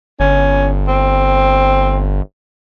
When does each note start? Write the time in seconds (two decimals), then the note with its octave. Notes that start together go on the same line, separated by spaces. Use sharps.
0.20 G1 C#4
0.87 C4